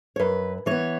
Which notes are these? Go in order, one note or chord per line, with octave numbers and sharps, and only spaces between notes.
C#5
F#2 B4
E3 B3 C#5